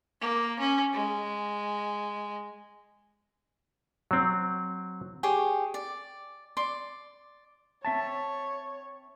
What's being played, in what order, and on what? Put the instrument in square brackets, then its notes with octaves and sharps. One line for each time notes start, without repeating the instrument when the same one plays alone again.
[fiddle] A#3
C#4
G#3
[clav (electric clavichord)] F#3 C4
[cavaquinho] G4 G#4 C#5
D5
D5 C6
[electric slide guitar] C4 E5 A5 [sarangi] C#5